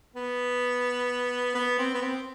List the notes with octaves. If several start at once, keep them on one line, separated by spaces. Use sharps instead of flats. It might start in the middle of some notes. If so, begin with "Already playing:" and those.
B3
B3
C4
B3
C4